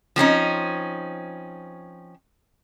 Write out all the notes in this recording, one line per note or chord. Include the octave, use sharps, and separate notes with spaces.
F3 C4 C#4 D#4